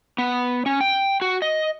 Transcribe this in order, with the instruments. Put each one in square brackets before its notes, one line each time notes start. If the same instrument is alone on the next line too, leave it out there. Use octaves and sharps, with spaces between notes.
[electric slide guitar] B3
C#4
G5
F#4
D#5